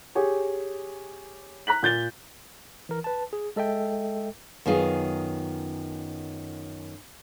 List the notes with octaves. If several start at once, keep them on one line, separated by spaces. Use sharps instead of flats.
G4 G#4 C#5
A#5 F#6 B6 F#7
A#2 G6 A6 G7
E3 A#4
B4 A5
G#4
G#3 A4 D#5 E5 G5
F#2 D#3 B3 F4 G#4